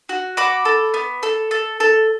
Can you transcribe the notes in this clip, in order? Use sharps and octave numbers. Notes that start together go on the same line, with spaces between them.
F#4
F#4 B5 D6
A4
B3
A4
A4
A4